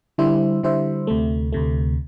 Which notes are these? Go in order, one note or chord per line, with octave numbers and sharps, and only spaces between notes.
D3 G3 E4 C5 E5
D3 G3 E4 C5 E5
D2 C3 A3
D2 C3 A3